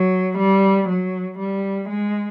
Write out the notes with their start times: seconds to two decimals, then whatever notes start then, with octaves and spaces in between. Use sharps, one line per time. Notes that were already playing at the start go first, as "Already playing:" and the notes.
Already playing: F#3
0.38 G3
0.89 F#3
1.39 G3
1.89 G#3